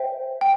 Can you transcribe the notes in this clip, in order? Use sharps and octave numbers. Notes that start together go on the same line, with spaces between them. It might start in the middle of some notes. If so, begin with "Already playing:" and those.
Already playing: C5 E5 G5
G5